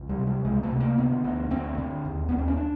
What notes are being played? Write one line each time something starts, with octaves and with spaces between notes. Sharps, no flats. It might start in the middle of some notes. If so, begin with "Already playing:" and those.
Already playing: C#2
G3
C3
G3
C#2 G#3
A3
C3
A#3
D3 B3
D2
D2 C4
D3
D#2
D#2 B3
C4
C#4
D4